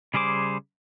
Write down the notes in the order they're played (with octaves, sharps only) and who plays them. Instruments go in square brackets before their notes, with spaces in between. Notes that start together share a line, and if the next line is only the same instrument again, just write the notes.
[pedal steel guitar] C#3 G3 G#4 C5 D6